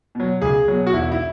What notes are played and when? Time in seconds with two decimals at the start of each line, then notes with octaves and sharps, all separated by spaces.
0.15 B2 F#3
0.41 C#2 G#4
0.68 B2 F#3
0.87 F#4
0.93 E1 E4
1.12 E4